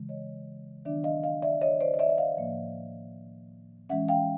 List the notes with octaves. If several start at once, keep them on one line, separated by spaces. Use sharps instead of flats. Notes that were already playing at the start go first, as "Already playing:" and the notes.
Already playing: C#3 E3 G#3
C#5 D#5
D#3 F#3 B3 D4 D5 E5
D#5 F5
D#5 F5
D5 E5
C#5 D#5
C5 D5
D#5
D5 E5
E5
D#5 F5
A2 F3 A#3
E3 G#3 C#4 E5 F#5
F5 G5